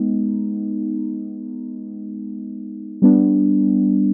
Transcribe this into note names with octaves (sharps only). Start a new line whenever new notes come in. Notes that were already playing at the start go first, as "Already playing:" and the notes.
Already playing: G#3 B3 D#4
G3 B3 D4